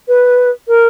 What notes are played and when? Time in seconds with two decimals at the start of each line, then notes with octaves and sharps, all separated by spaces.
0.08 B4
0.68 A#4